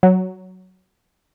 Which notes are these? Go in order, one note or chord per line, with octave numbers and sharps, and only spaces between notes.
F#3